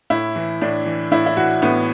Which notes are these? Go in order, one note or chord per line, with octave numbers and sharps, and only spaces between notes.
A2 E4
E3
A2 D4
E3
A2 E4
E4
E3 F#4
A2 B3